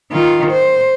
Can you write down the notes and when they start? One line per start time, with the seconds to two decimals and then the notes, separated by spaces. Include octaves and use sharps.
0.12 D#3 F4
0.52 C5